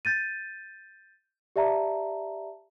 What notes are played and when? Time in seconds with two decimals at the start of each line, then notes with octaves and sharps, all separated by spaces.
0.05 G6 A6 D#7
1.56 G4 D5 E5 A5 A#5